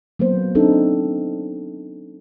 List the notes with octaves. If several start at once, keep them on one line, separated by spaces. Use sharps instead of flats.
F#3 A#3 B3 C5
C4 D4 D#4 A4